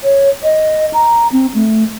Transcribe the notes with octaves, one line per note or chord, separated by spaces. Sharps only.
C#5
D#5
A#5
C4
A3